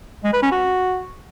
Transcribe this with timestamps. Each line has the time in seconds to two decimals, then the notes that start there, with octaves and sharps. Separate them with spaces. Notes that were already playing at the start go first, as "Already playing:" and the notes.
0.24 G#3
0.33 B4
0.43 C#4
0.52 F#4